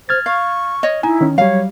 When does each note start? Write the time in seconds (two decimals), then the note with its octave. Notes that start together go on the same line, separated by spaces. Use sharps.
0.09 C5 F6 G#6 A6
0.26 F5 C#6
0.83 C#5 D#5
1.03 D#4 E4 G#5
1.21 D#3 C#4
1.38 F#3 G3 C#5 F5